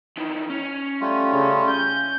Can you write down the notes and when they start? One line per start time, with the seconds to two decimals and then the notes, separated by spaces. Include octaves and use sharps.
0.17 D#3 E3
0.50 C#4
1.01 G3 A3 F4
1.31 C#3
1.71 G6